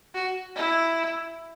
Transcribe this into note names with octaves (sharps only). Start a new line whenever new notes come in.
F#4
E4